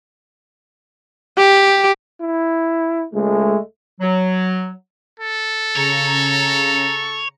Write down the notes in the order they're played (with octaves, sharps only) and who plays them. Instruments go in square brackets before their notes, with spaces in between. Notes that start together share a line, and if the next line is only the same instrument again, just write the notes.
[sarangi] G4
[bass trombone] E4
[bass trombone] C#2 [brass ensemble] G#3 A3
[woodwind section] F#3
[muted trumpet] A4
[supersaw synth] C#3 A#5 C#7 [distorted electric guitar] C#5